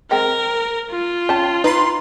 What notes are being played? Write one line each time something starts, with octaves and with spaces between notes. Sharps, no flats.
G#3 C4 A#4 G5
F4
C#4 G5 A5
D#4 B4 A#5 C6